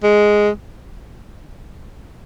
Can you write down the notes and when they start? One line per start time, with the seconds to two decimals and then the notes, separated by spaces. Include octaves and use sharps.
0.03 G#3